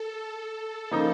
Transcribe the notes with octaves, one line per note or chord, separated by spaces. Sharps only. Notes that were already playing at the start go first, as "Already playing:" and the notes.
Already playing: A4
A4
C#3 F3 A#3 D#4